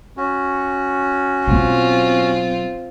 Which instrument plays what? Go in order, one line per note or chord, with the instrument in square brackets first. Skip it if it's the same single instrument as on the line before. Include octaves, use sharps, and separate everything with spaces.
[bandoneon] C#4 F#4
[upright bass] B2 F#3 [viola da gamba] C4 F4